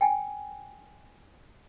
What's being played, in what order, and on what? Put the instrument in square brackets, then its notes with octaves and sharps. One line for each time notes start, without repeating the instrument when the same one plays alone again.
[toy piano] G5 G#5